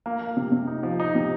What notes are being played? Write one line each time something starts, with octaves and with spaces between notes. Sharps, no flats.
A#3
A#3
C3
C3
D#4
F3
D#4
C3